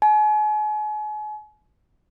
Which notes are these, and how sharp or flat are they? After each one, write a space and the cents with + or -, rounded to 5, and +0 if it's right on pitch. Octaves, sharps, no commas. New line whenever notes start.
G#5 +40